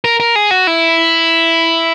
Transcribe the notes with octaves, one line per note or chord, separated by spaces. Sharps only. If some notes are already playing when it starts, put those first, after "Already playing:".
A#4
A#4
G#4
F#4
E4